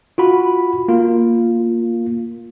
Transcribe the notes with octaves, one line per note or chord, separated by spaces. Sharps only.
F4 F#4 B5
A#3 F4